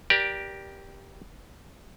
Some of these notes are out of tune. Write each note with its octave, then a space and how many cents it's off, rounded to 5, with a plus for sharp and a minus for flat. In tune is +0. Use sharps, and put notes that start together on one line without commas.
G4 +0 A#4 +30 D5 +0